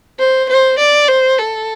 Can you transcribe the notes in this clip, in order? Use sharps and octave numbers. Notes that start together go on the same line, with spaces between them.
C5
C5
D5
C5
A4